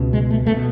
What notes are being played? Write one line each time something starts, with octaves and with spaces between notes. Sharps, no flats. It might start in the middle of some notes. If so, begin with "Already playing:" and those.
Already playing: C#2 B2
G#3
A3
A3
B2